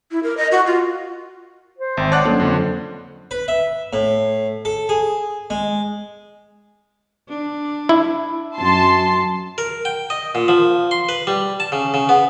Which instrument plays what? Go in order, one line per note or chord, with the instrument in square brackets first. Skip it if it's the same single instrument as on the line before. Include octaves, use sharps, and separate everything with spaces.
[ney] E4
A#4
D#5
F#4
F4
[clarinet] C5
[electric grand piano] G#1 [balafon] E5 G5
[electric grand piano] C#5 D5 F#5 [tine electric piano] A5 D6 F#6
[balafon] F#3 C#4 A4 [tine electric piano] A#3 [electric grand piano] D4
[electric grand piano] F2 D3
[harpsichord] B4
E5
A2
A4
G#4
G#3
[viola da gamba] D4
[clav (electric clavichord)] E4
[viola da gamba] F#2 [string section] A5 C6
[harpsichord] A#4
G5
D#5
A#2
F3
C6
B4
G3
A5
C#3
C#3
B3